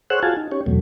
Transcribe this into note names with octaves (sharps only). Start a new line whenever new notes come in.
G#4 C5 C#5 F#5 E6 F#6
F4 F#4 G#4 F5 G#5 A5
D#4
C#4 G4 C#5
E2 B2 F#3 A3